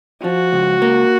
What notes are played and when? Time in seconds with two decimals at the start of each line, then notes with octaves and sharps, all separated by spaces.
0.24 F3 F#4
0.53 C#2
0.82 A#3